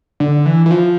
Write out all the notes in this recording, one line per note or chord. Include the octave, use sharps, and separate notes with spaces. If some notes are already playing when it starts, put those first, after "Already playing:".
D3
E3
E3
F3